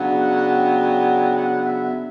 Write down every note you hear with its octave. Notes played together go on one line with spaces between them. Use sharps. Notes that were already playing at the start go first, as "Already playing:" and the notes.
Already playing: C#3 F#3 B3 D4
F#5
G5
F#5
E5